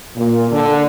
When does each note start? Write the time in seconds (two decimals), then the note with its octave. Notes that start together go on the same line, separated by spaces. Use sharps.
0.16 A#2
0.50 D3